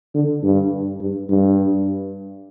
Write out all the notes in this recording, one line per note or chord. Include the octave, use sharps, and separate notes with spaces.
D3
G2
G2
G2